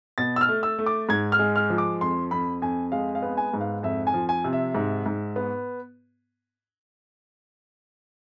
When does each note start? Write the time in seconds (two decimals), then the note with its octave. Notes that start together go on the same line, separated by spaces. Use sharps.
0.18 B2 A6
0.36 E6
0.41 F6
0.48 A3
0.63 E6
0.79 A3
0.86 D6
1.09 G#2 G#6
1.32 F6
1.39 G#3
1.56 F6
1.70 F3
1.78 D6
2.01 F2 C6
2.31 F2 B5
2.62 F2 G#5
2.92 G#3 F5
3.15 F5
3.22 B3
3.37 G#5
3.53 G#2
3.61 F5
3.83 F2 E5
4.07 G#5
4.14 F3
4.29 G#5
4.44 C3
4.53 E5
4.75 G#2
5.06 G#2
5.36 B3